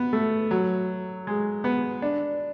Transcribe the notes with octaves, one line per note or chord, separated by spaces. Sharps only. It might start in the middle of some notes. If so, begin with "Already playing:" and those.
Already playing: B3
A3
F#3
G#3
B3
D4